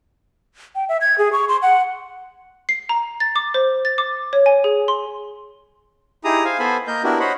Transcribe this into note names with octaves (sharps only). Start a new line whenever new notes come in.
G5
E5
G#6
G#4
C#6
C6
F#5
C7
A#5
A6
D6
C5
A6
D6
C#5
G#5
G#4
C6
D#4 E4 G4 G#4 A#5 D#6
C5 F5 G#5
B3 A4 C5 G#5 B5
A#3 A#4 D#5 G6
B3 D4 E4 F#4 G4 A#4
C5 C#5 D#5 F#5 B5